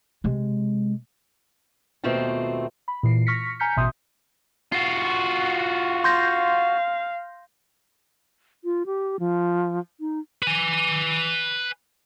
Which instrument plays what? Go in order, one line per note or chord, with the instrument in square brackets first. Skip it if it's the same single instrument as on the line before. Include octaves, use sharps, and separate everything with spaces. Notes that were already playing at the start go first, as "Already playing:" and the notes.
[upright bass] C3 G#3
[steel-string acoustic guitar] D#2 B2 A3 C4 F4 G5
[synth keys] B5
A#2 E3 C7
C#6 F6 A#6 B6 C#7
G#5 A#5 F6 G6 B6 C#7
A1 B2 E5 C6 D#6 G6
[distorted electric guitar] F4 F#4
[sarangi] F5 [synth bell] C6 G6 A#6
[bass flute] F4
G4
F3
D#4
[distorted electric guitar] B4 G#5